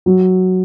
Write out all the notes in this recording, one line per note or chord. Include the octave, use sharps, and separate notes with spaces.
F#3